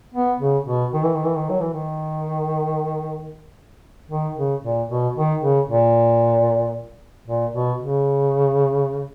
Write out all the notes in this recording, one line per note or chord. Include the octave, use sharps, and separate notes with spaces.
B3
C#3
B2
D#3
E3
D#3
E3
D#3
F#3
E3
D#3
D#3
C#3
A#2
B2
D#3
C#3
A#2
A#2
B2
C#3